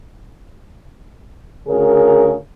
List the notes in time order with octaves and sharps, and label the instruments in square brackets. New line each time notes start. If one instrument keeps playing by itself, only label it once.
[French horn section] D2 C#3 G#4 A#4